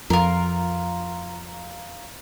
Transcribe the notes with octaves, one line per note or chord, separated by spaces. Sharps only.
F2 F4 A#4